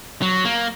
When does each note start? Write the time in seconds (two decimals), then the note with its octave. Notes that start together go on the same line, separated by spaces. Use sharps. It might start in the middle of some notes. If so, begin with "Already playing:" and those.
0.22 F#3
0.45 A#3